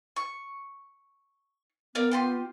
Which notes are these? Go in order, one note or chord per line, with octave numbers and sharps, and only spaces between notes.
C#6
B3 A#4 D5 F5
F4 G4 C6